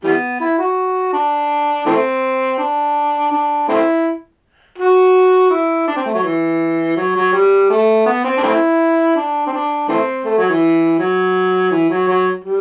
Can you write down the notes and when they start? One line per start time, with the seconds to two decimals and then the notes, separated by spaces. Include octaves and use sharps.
0.04 E3 G3 B3
0.41 E4
0.58 F#4
1.13 D4
1.86 E3 A3 C4
2.58 D4
3.32 D4
3.69 A3 C4 E4
4.78 F#4
5.51 E4
5.88 D4
5.97 C4
6.06 A3
6.14 F#3
6.24 E3
6.97 F#3
7.16 F#3
7.33 G3
7.71 A3
8.06 B3
8.25 C4
8.38 D4
8.44 A3 C4 E4
9.16 D4
9.47 C4
9.53 D4
9.89 E3 A3 C4
10.25 A3
10.38 F#3
10.50 E3
10.98 F#3
11.71 E3
11.90 F#3
12.08 F#3
12.44 G3